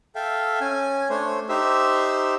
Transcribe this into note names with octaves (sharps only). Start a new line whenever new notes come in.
A4 E5 F5 G5
C#4 G#5
A3 D4 C5 C#5
D#4 G4 C5 E5 E6